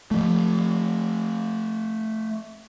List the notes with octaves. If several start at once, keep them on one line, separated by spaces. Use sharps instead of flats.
F3 A3